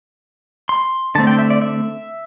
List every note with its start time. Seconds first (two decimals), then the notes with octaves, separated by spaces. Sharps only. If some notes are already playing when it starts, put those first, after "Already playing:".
0.69 C6
1.15 D3 A3 C4 A5
1.27 G5
1.38 E5
1.50 D5
1.62 E5